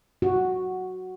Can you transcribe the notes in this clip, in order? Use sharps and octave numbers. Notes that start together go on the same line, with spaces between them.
F#4